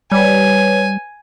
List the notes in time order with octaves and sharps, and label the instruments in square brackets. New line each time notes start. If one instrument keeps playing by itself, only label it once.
[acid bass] G3 [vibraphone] B4 C#5 [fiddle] G#5